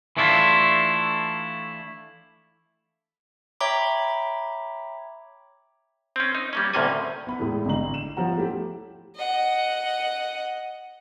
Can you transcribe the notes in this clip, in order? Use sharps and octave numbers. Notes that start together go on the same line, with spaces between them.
E3 A3 D4 E4 F4
C#5 E5 G5 A#5 B5 D6
C4 C#4
D#4
G3 A#3 C#4
D2 A2 C3 A#3 C#4 G#5
B3 B5
E2 A2 G#3
A1 D3 A#5 F#7
E7
F3 G3 B3 C#4 F#5 A#5
A3 E4 G4
D#5 F#5